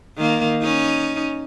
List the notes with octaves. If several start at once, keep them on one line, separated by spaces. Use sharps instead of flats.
D#3 A#3
C#4 D#4